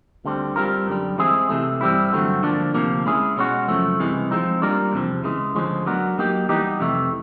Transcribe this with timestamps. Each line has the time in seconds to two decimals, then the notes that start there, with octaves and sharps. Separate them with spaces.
0.25 D2 D3 G3 C4
0.56 G3 C4 F4 A#4
0.87 F#2 D3 G3
1.18 E3 G#3 C4 E4 G#4
1.50 C3 E3 A3
1.81 G2 E3 G3 C4 E4
2.13 G2 D3 F#3 A3 C4
2.43 D3 F3 A#3 D4
2.74 D2 C3 F3 A#3
3.06 G#3 C#4 E4 G#4
3.36 B2 G#3 C#4 F#4
3.68 F#2 C#3 F3 A3
3.99 C2 C3 E3 G#3
4.31 F3 G#3 C4 D#4
4.62 G3 A#3 D4 F4 A#4
4.93 E2 C3 F3
5.24 C#3 E3 G#3
5.55 D2 D3 F3 G#3 C#4
5.86 F#3 B3 D4 F#4 A#4
6.18 F#3 A#3 D#4 G4
6.49 E3 G3 B3 D#4 G4
6.80 F2 C3 E3 A3